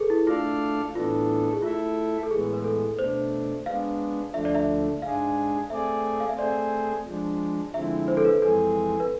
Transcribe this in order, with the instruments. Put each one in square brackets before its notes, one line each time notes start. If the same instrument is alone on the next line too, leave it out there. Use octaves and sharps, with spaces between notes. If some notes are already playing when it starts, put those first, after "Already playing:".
Already playing: [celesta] G#4 A4 B4
E4
[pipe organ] A3 D4 A4 D5 F5 [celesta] F4
[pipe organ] A2 E3 B3 D4 A4 [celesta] F4
[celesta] G#4
[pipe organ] A3 E4 A4 E5 [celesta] F4
[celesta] A4
[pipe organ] A2 E3 G#3 B3 [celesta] G#4
[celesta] B4
A4
[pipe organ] B2 A3 D4 [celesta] C5
[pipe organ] G#3 B3 D4 [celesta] F5
[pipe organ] D2 D3 F3 A3 D4 [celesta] E5
[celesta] D5
E5
[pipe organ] G#2 G#3 D4 G#4 [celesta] F5
[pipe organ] A3 C4 G#4 D5 [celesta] E5
[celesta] F5
E5
[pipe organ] A3 C4 G#4 C5 [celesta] D5
[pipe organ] F3 G#3 D4
[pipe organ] D3 F3 G#3 C4 E4 [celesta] E5
[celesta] C5
A4
B4
[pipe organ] F2 E3 G#3 C4 G#4 [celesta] A4
[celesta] B4